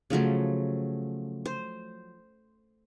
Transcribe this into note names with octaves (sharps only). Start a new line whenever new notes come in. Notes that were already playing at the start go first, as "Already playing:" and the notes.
C#3 F3 F#3 A3
C5